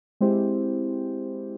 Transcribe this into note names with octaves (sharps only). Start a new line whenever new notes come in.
G#3 C4 E4 G4 C5